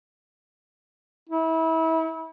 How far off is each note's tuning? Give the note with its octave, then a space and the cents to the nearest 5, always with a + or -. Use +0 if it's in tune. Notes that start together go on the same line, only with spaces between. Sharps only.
E4 -30